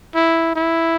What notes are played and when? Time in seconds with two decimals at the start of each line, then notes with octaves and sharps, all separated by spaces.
0.15 E4
0.56 E4